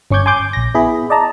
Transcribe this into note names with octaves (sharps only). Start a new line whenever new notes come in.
G1 C#4 C#6 D6 G6 G#6
G#5 C6 D6 G6
A#1 A#6
B3 E4 G#4 B5
D5 D#5 A5 A#5